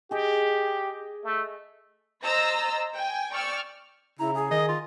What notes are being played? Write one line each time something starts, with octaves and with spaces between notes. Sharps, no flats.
G4 G#4 D#5
A3
C5 D#5 A#5 E6 A6 A#6
G5 G#5
D5 G5 C#6 E6 F6
C#3 E4 A#5
G#4
D#3 D#5
F4